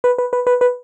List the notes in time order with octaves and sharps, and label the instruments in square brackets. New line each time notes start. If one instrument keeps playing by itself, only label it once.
[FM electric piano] B4
B4
B4
B4
B4